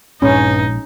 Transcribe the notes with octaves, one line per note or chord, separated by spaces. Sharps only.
A#1 G2 A#2 G#3 C#4 D#4